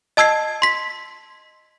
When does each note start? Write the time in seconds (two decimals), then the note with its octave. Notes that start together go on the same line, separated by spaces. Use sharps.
0.17 D#5 A5 E6 G#6 C7
0.62 C6 B6